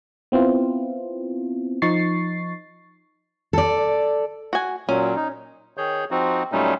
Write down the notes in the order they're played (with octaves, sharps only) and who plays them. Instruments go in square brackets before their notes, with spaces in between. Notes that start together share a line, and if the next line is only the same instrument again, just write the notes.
[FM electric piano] B3 C4 E4 F4
F3 D#4 C#6 A6 C7
[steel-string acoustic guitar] A4 D5
[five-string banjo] F#4 G#5
[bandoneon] A#2 F#3 [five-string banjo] C#4
[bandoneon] D#4
D#3 G#4 C#5 G6
F3 C4 D#4 F#4
A#2 F#3 G3 A3 C#4 D#4